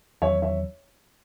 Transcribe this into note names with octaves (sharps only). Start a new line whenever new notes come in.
E2 D#3 F#3 C4 C#5 E5
C#5 E5